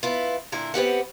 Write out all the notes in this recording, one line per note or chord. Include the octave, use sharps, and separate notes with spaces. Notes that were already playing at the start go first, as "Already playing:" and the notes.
B3 E4 F4
A#2 D3 E4 A#4
B3 C4 G4 F#5